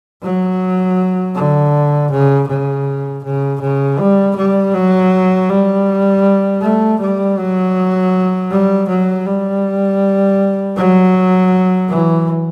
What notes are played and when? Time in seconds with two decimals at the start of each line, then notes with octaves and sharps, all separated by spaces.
0.23 F#3
1.35 D3
2.11 C#3
2.48 C#3
3.24 C#3
3.61 C#3
3.99 G3
4.36 G3
4.74 F#3
5.50 G3
6.62 A3
7.00 G3
7.38 F#3
8.51 G3
8.88 F#3
9.26 G3
10.77 F#3
11.90 E3